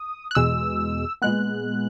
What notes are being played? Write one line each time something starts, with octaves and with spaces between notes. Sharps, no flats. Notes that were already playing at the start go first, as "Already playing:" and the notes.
Already playing: D#6
F#6
E2 B2 G#3 E6
A#2 G#3 B3 F#6